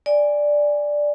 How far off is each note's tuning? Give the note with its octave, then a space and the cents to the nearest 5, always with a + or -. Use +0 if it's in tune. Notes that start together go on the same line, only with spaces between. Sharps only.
D5 +0 G#5 -15